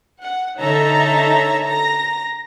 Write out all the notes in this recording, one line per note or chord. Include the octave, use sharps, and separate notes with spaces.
F#5
D3 D#4 A4 C#5 E5 A#5
A#5 A#6